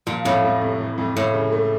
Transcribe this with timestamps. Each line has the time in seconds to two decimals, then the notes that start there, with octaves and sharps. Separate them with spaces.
0.07 A#2 F3
0.25 F2 A2
0.44 F2
0.61 C3
0.80 E3
0.98 F2
1.16 F2 A2
1.34 C#3
1.52 A3